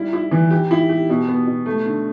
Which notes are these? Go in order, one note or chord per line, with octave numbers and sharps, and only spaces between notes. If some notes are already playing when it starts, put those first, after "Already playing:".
Already playing: G3 E4
E4
E3
G4
E4
G4
B2
B3
B2
A3
D3